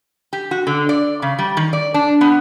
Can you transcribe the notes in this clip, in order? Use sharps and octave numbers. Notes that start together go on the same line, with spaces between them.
G4
F#4
D3
D5
C#3
G3
D#3
D5
D4
B3